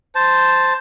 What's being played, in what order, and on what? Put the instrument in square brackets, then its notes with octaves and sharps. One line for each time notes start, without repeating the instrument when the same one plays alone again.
[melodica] C5 A5